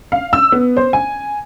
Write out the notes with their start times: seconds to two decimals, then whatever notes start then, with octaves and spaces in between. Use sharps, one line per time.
0.12 F5
0.33 E6
0.52 B3
0.77 C5
0.93 G#5